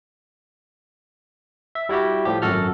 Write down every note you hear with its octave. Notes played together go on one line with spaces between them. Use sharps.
E5
G3 E4 F#4 G4
A2 F3 G4
G#1 F#2 F#4 A4 F6